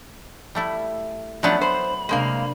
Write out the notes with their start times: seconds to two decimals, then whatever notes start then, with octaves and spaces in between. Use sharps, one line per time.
0.55 G3 A3 E4
1.43 F3 F#3 A3 B3 D4 D5
1.61 C5 B5
2.09 C3 G#3 A#3 D4 F5 G6